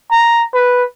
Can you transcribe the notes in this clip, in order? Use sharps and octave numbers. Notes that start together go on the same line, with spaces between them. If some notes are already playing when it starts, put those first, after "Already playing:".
A#5
B4